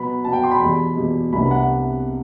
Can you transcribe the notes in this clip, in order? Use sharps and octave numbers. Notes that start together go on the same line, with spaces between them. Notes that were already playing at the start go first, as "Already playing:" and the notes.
Already playing: B2 F#3 B3 B5
B2 F#3 B3 A5
G5
C6
B5
E2 B2 G3
E2 B2 G3
C2 C3 G3 B3 D4 B5
F#5